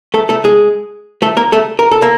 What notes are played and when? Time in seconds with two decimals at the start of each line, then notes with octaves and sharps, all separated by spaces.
0.14 A3 A4
0.29 A3 A4
0.44 G#3 G#4
1.22 A3 A4
1.37 A#3 A#4
1.52 A3 A4
1.79 A#4
1.91 A4
2.02 A#3